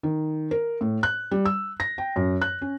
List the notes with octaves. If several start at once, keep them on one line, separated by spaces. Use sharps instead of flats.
D#3
A#4
A2
F#6
G3
E6
A#6
G5
F#2
F#6
C#4